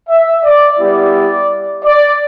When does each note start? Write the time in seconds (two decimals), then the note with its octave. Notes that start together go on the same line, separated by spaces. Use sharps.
0.09 E5
0.44 D5
0.79 G3 B3 E4 G4 D5
1.85 D5